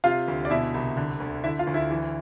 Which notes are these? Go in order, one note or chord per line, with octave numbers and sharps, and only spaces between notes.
C3 F4 F5
D2
D5
B2 E4 E5
C2
D3
D2
D3 E4 E5
F4 F5
D2
E4 E5
E3